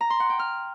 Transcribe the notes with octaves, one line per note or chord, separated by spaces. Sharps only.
A#5
C6
F#5
G5
F6